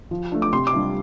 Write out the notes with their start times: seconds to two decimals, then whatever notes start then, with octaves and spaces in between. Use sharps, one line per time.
0.11 F3
0.32 A3 D4
0.42 D6
0.53 C3 C6
0.67 D6
0.73 G3 D4 F4